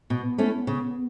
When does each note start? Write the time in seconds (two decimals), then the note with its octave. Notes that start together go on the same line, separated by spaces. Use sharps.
0.10 B2 B3
0.38 A3 C#4 E4
0.67 C#3